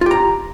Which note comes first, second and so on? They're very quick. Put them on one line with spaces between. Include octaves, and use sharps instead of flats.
F4 G4 A#5